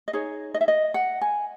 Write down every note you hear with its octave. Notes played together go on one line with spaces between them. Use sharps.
D#5
D#4 G#4 C#5
D#5
E5
D#5
F#5
G#5